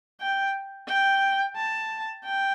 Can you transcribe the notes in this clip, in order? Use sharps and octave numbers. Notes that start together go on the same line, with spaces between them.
G5
G5
A5
G5